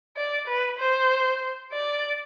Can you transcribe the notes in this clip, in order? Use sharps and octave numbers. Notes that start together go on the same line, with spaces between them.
D5
B4
C5
D5